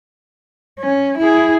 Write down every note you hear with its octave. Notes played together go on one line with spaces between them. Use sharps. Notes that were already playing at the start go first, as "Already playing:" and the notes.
C#4
E4 G#4